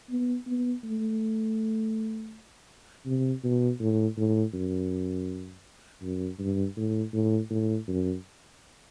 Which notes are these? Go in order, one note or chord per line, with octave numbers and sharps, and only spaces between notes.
B3
B3
A3
C3
B2
A2
A2
F#2
F#2
G2
A2
A2
A2
F#2